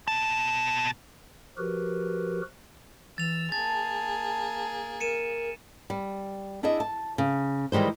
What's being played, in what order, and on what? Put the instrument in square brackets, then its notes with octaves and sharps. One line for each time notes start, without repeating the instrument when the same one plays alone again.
[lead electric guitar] B2 A5
[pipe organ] F3 F#4 G4 A#4 B4
[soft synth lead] E3 [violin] E6 [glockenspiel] A6 F7
[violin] A#3 G#4 [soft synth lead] A5 [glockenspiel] A6
[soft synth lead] A#4 [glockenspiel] C#7 D#7 E7
[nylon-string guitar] G3
D4 E4 G#4 D#5 E5
A5
C#3
D#3 E3 G3 G#3 C5